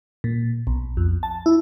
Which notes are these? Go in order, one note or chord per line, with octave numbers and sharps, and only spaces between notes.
A#2
B1
F2
A5
E4